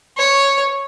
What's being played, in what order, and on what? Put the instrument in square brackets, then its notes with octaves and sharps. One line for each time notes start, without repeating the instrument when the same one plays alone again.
[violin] C#5